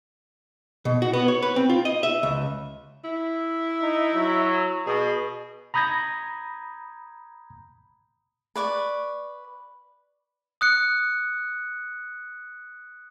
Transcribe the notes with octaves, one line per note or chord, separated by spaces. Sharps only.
B2
F#4
B3
C#5
B4
C4
F4
D#5
E5
C#2
E4
D#4
F#3
B2 G#4
A#5 B5 D#6 G6 G#6 A#6
B4 D5 C#6
D#6 F#6 C#7